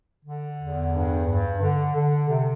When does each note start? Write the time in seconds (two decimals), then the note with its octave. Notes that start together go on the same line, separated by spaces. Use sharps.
0.25 D3
0.60 E2
0.93 G2
1.27 G2
1.61 D3
1.95 D3
2.29 C3